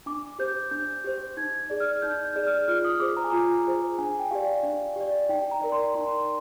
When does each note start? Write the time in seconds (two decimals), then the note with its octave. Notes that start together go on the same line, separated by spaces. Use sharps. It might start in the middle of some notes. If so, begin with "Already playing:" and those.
0.06 D4 D6
0.39 G4 C5 G6
0.71 D4 G6
1.04 G4 C5
1.37 D#4 G#6
1.70 G#4 D5
1.80 F6
2.02 D#4 G6
2.25 G6
2.36 G#4 D5
2.47 F6
2.68 F4 F6
2.85 D#6
3.00 G#4 C5 D6
3.17 A#5
3.24 G#5
3.31 F4 A#5
3.66 G#4 C5
3.98 D4 G#5
4.19 G5
4.31 G4 D5 F5
4.63 D4
4.96 G4 D5
5.29 D#4 G5
5.51 A#5
5.62 A#4 D5
5.72 C6
5.94 D#4 C6